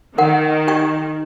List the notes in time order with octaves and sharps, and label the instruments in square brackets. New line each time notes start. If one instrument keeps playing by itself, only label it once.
[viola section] D#3 [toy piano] A#4 F#5
[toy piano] G4 G5 C#6